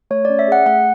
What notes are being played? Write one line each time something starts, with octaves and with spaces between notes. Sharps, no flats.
A3 C#5
D5
C#4
E5
G#4 F#5
A3 F#5